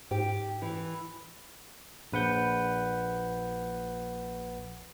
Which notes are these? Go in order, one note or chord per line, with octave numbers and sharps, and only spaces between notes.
G#2 G4
E3
A#1 B4 F#5 G6